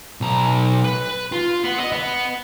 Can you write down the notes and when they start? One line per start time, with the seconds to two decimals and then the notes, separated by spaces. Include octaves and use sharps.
0.21 B1 A#5
0.84 B4
1.32 F4
1.64 B3
1.80 D#5
1.92 B3